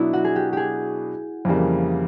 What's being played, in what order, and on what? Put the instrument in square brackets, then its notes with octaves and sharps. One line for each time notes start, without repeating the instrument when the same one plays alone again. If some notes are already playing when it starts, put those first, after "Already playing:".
Already playing: [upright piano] B2 F#3 B3 D4 [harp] E4
[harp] F#4
G#4
G4
G4 G#4
[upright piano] F2 C#3 E3 G3 A#3